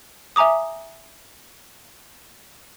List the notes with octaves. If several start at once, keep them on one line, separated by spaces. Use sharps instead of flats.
E5 G#5 A#5 D6 D#6